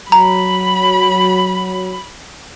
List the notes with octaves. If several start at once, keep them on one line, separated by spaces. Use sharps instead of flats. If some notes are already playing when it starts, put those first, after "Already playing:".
F#3 A#5 B5